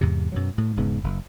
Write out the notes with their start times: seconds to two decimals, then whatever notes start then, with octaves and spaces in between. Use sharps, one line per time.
0.01 E2 G#2 C3
0.32 F#2 B2 F#3
0.58 A2
0.76 E1 G#2 C#3 B3
1.04 F#1